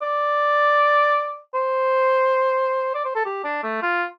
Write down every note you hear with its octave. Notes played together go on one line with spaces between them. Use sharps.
D5
C5
D5
C5
A4
G4
D4
A3
F4